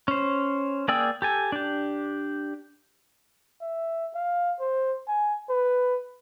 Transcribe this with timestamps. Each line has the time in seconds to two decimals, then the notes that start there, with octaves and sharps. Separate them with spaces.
0.08 C#4 C5
0.88 A#3 G#4 D5 G5 E6
1.22 G4 A4 G#5
1.52 D4 G4
3.61 E5
4.15 F5
4.60 C5
5.08 G#5
5.49 B4